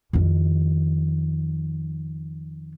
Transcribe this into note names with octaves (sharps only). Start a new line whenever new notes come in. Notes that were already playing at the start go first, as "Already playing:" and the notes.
F2 D#3